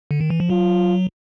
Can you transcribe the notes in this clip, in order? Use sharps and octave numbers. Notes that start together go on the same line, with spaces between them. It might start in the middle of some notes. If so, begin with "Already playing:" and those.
D3
D#3
E3
F3
F#3 F4